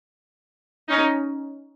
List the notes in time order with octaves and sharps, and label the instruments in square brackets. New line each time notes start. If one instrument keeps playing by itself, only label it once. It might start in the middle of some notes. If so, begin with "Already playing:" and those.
[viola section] C#4 D#4